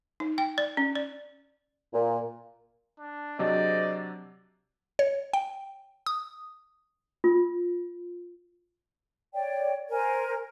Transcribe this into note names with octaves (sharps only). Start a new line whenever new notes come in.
D#4
G5
D5
C#4
D5
A#2
D4
C3 F#3 D4 G#4 C5 D5 D#5
C#5
G5
D#6
F4
C#5 D5 G5
A#4 C5 G#5